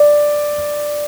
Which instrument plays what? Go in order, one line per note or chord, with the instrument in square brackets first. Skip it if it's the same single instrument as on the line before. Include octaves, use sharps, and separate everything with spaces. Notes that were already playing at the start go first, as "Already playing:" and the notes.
Already playing: [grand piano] D5